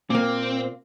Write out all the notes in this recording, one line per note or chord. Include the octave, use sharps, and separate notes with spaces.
A#2 A#3 C4